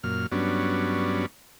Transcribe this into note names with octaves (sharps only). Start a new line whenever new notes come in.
F#2 A#2 F6
G2 F#3 B3 C#4 D4